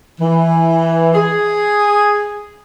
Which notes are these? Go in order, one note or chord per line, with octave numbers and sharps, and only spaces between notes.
E3
G#4